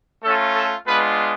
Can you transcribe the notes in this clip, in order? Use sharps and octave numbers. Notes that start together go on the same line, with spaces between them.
A3 C#4 F4 A4
A4
G#3 B3 D4 F4 B4